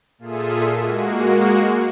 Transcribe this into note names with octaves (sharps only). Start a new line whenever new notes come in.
A#2 F4 G#4 A4 E5 D#6
G#3 A#3 F#4